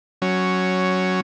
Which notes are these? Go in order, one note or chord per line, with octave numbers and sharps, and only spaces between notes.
F#3 C#4